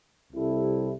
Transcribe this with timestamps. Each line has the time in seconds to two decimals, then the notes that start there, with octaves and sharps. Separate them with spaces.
0.32 C2 C3 G3 E4 A4